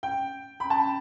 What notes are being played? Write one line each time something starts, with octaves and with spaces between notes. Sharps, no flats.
G5
B5
A5